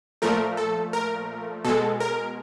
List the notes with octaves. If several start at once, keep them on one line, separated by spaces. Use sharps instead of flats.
A#2 F3 A3 A#4
A4
A#4
B2 G#3 A4
A#4